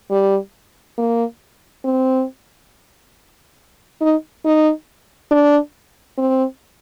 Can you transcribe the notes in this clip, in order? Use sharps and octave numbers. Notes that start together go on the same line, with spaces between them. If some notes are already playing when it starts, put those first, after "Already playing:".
G3
A#3
C4
D#4
D#4
D4
C4